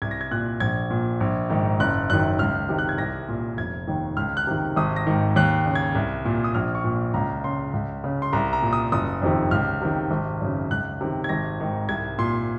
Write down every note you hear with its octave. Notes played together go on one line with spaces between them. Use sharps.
C2 G#6
A#6
G#6
A#2 F#6
A#1 G#6
A#2
A#1
G#2 D#3
F#1 F#6
F#2 D#3 F#6
C#2 F6
C3 D#3
F#6
G#6
C2 A#6
A#2
F1 G#6
D#2 D#3
C#2 F6
F#6
C3 D#3
G#1 D#6
A#6
G#2 D#3
D#2 F#6
C#3
G#6
C2
A#2
D#6
A#1 F6
C#6
A#2
C#2 A#5
C#3 C6
C#2
C#3
C6
C2 A#5
A#5
A#2
D#6
F#1 D#6
F2 C3 D#3
C#2 F6
C3 D#3
G#1
F#2 C#3
C#2 F#6
C3 D#3
G#6
G#1 A#6
G#2 D#3
C2 G#6
A#2 C6